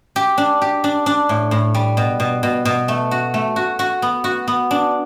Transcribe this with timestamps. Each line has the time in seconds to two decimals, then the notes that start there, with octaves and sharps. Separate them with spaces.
0.16 G4
0.38 D4
0.61 G4
0.84 D4
1.06 D4
1.29 A2
1.51 A2
1.74 G3
1.97 B2
2.20 B2
2.43 B2
2.65 B2
2.88 A3
3.11 F#4
3.34 A3
3.56 F#4
3.79 F#4
4.02 B3
4.24 F#4
4.48 B3
4.71 D4